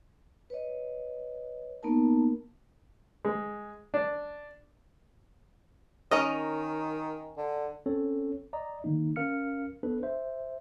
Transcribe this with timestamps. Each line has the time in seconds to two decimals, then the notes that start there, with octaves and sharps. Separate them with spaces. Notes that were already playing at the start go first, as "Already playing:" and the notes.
0.50 B4 C#5 D#5
1.83 A#3 B3 D#4 A#4 A5
3.25 G#3
3.94 D4
6.11 D#3 C#4 A#4 D#5
7.37 D3
7.86 C4 C#4 A4 C#5
8.53 D5 D#5 A#5
8.84 D3 D#3 A#3 D#4
9.16 C#4 A#4 F5 F6 C#7
9.83 B3 D4 A4 B4
10.03 C5 E5